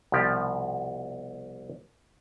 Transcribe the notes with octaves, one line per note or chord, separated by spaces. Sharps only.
C2 B2 F3 G4 D5